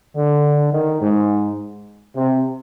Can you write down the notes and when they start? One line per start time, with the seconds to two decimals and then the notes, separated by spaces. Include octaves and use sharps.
0.16 D3
0.73 D#3
1.01 G#2
2.15 C3